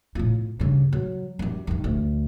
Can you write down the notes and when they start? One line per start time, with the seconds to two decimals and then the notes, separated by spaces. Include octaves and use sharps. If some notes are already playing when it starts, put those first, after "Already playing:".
0.15 A2 F4
0.60 G2 C#3
0.93 F#3
1.39 F#2 G3
1.67 G2 D#3
1.84 D2